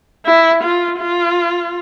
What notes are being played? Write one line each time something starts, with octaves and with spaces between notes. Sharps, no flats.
E4
F4
F4